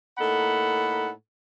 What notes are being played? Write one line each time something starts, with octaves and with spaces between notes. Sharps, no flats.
A2 A#3 D#4 A4 F#5 B5